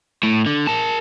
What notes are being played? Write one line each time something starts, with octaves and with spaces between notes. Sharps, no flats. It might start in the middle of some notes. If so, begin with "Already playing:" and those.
A2
D3
A#4 A5